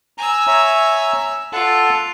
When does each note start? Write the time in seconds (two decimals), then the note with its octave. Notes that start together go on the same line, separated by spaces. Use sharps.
0.18 G#5 A#5 E6
0.47 C#5 E5 A#5
1.53 F4 A4 F#5 A5